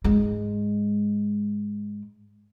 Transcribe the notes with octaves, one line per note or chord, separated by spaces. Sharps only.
G#2 G#3